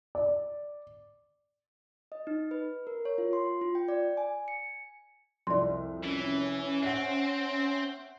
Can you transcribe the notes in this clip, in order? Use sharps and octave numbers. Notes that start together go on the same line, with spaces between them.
D5
D#5
D#4
B4
A#4
C#5
F4
C6
F4
G5
D5
G#5
C#7
C2 F2 D5 C6
E3 C#4
C4 E5 F#5